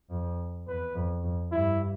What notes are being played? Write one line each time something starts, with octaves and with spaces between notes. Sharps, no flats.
F2
E2 B4
F2
F2
G2 E4